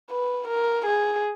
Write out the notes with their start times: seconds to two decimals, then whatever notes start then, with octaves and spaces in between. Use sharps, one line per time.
0.10 B4
0.48 A#4
0.86 G#4